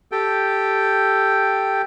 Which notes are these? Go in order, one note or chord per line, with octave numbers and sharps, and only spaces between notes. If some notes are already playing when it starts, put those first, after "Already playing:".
G4 A4 G5